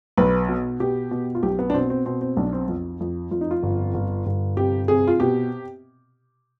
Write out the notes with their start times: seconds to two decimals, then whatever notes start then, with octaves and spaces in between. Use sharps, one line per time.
0.17 B1 B4
0.48 B2
0.80 B2 G4
1.11 B2
1.35 F4
1.43 B1 G4
1.59 B3
1.70 D4
1.74 B2 C4
1.90 C4
2.06 B2 C4
2.21 C4
2.37 B1 D4
2.53 C4
2.68 F2
3.00 F2
3.31 F2 F4
3.41 D#4
3.51 F4
3.63 G1
3.94 G1
4.26 G1
4.57 C3 G4
4.88 C3 G#4
5.07 F4
5.20 B2 G4